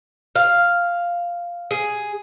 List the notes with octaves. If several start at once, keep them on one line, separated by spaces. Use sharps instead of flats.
F5
G#4